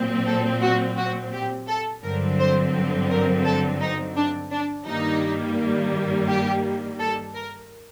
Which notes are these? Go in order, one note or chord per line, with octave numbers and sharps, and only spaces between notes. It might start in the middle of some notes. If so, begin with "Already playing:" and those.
Already playing: A#2 F#3 C4
A4
F#4
F#4
G4
A4
G2 D3 F#3 C4 A#4
C5
A#4
A4
D#4
D4
D4
G2 D#3 G3 A#3 D#4
G4
A4
A#4